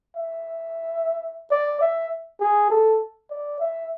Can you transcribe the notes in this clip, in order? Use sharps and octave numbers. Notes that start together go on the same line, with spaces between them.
E5
D5
E5
G#4
A4
D5
E5